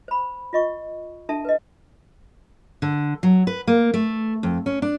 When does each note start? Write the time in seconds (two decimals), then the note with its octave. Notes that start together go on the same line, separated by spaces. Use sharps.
0.08 C5 B5
0.53 F4 D#5 C#6
1.29 D4 E4 A4 E5 A5
1.45 B4 D#5
2.82 D3
3.23 F#3
3.47 B4
3.67 A#3
3.94 A3
4.43 F2
4.66 C#4
4.82 D4